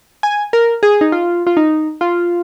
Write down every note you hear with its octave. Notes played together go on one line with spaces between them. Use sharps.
G#5
A#4
G#4
D#4
F4
F4
D#4
F4